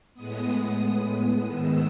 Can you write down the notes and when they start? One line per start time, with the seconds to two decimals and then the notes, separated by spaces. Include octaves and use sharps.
0.14 A2 G#3 B3 D#6
1.13 D#6
1.45 G#2 D#3 G#3 B3 E6